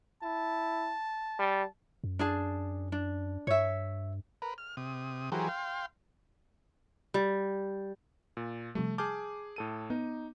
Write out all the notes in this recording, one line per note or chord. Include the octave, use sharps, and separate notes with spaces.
E4 A5
G3
F#2
D4 G#4 A5
D4
G2 C#5 E5
A#4 B4
F6
C3 D#6
E3 F#3 G4 G#4 A#4 C5
F5 G5 C6
G3
A#2
C3 F3 G3 A3
G#4 A5 D6 F6 G6
A2 A4 D#7
B3 D#4